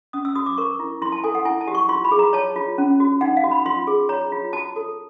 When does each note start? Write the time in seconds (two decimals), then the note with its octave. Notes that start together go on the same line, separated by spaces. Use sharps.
0.13 C#4 D#6
0.25 E6
0.35 F#4 D#6
0.46 D6
0.57 A#4 C#6
0.80 E4
1.02 E4 C6
1.12 A5
1.24 A4 G#5
1.35 F#5
1.45 E4 G#5
1.61 A5
1.68 G4
1.75 C#6
1.89 F4 C6
2.04 B5
2.12 G#4
2.19 A#5
2.33 C#5 A5
2.56 F4
2.78 C#4
3.00 F#4
3.21 D#4 F#5
3.37 F5
3.44 F#4
3.51 B5
3.66 F4 C6
3.87 G#4
4.09 C#5 A#5
4.32 F4
4.53 F#4 A5
4.76 A4